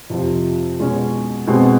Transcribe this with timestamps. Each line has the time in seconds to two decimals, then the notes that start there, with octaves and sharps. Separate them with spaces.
0.10 F2 C3 F3
0.79 B2 G#3 C#4
1.47 B2 G#3 C4